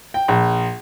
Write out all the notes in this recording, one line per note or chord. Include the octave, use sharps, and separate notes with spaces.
G5
A#1